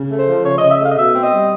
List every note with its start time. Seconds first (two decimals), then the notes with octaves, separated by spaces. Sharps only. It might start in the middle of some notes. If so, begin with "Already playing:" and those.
Already playing: C#3
0.10 A3
0.18 C5
0.27 F3
0.44 C#3 C#5
0.58 C#3 D#5
0.71 E5
0.79 A3 F5
0.91 D#5
0.96 B2 E5
1.14 C4
1.23 D#5
1.32 G3